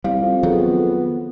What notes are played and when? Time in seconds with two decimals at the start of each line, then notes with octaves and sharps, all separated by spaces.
0.04 C2 G3 F5
0.22 F2
0.43 D#3 F#3 B3 G#4 A4